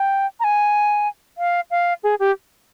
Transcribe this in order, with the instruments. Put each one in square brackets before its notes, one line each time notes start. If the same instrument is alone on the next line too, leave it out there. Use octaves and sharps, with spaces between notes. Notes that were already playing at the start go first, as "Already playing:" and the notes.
Already playing: [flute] G5
A#5
G#5
F5
F5
G#4
G4